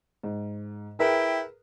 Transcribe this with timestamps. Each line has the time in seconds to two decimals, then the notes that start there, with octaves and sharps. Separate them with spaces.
0.23 G#2
0.99 E4 G#4 A#4 B4 G5